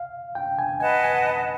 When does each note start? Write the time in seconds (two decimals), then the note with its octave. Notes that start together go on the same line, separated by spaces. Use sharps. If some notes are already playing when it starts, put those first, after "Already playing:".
Already playing: F5
0.35 G5
0.59 G#5
0.80 B4 D#5 F#5 G#5 A5
1.04 G#5